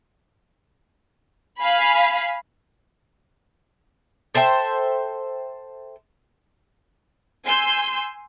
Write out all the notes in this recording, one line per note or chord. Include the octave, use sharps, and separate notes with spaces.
F5 G#5 B5
A4 C5 E5 G5
G#5 C6 E6 G6